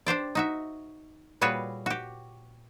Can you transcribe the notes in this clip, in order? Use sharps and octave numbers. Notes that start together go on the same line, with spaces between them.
D4 G4 C5 D5
D#4 F#4 E5
A#2 G3 F#4 G#4 B4 C#5
F#4 G4